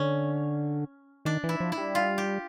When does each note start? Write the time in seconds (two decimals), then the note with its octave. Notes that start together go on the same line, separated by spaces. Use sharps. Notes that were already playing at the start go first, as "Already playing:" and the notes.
Already playing: D3 C#4
1.25 D#3 D4
1.44 E3
1.49 E4
1.60 F3
1.72 E4
1.78 G3
1.95 F4
2.18 G4